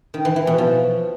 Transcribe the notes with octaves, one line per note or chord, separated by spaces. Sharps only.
D#3
E3
E3
B2
F3